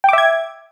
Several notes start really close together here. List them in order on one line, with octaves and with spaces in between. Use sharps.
G5 D6 E5 G#6